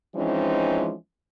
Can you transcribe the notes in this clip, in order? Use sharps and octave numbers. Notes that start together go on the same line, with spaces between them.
E3 F3 G#3 C4 C#4 D#4